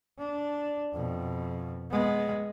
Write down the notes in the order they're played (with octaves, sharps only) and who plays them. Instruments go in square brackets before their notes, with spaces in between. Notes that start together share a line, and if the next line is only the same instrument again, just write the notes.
[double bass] D4
F2 B2
G#3 B3